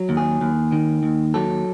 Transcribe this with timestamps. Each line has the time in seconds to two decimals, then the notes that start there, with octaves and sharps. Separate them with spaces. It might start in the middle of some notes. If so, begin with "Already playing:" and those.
Already playing: F#3
0.09 D#2
0.17 G#4
0.41 D#2
0.72 D#3
1.03 D#2
1.34 F#3 A4